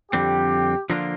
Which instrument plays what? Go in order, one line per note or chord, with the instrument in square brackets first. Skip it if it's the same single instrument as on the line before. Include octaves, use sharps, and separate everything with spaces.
[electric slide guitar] F2 D3 G3 C4 [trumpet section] G4
[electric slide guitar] D3 F3 A#3 D4 F4